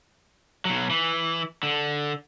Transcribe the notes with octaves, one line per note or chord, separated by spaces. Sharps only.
B2 F#3
E3
D3